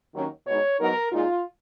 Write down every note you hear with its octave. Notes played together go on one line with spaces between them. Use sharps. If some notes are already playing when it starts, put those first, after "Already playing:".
D#2 D#3 F#3 C#4
B2 G#3 D#4 C#5
G#2 F#3 B3 D#4 A#4
A#2 G#3 D#4 F4